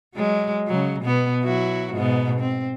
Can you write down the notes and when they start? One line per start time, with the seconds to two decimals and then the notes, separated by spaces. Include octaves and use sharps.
0.15 F#3 G#3
0.68 C#3 F#3
1.02 B2 B3
1.44 F#3 E4 F#4
1.94 G#2 B2 B3
2.41 C4